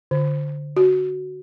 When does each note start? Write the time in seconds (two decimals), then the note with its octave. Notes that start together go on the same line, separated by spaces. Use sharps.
0.11 D3
0.77 F#4